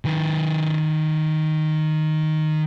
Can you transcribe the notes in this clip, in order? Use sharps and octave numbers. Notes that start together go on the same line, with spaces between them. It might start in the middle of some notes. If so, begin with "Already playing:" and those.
D#3 B4